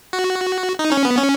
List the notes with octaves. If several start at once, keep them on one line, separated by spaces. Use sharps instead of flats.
F#4
D#4
C#4
B3
C#4